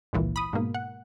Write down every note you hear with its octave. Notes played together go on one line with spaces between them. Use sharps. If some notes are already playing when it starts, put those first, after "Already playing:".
G#1 C#2 A#2 E3
B5 D#6
G#2 B2 A#3
F#5